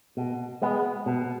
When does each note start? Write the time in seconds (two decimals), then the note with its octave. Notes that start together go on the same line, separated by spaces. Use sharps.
0.17 B2
0.62 G#3 B3
1.06 B2